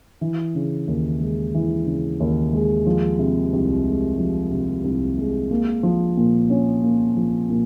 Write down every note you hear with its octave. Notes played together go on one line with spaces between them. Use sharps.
E3
C#3
D#2
G#3
E3
C#3
D#2
G#3
F3
C3
C2
G#3
F3
C3
C2
G#3
A#3
F3
A#2
C#4
A#3
F3
A#2